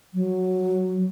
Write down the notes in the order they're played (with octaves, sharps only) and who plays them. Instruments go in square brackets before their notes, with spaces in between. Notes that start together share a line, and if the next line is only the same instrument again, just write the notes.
[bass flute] F#3